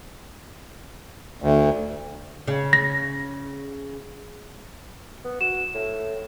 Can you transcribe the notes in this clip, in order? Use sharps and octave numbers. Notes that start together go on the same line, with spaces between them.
D2
C#3
A#6
B3
F#4 E7
A2